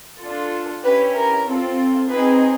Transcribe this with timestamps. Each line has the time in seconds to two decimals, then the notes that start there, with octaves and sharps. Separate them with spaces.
0.21 D4 F4 A4
0.84 C#4 E4 G4 B4
1.15 A#4
1.47 C4 F4 A4
2.09 C4 D#4 G#4 B4